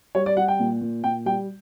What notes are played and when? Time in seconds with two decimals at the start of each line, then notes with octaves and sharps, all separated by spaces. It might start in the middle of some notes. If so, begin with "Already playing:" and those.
0.15 G3 C#5
0.26 D5
0.37 G3 F#5
0.48 G5
0.60 A#2
0.81 A#2
1.04 A#2 G5
1.26 G3 G5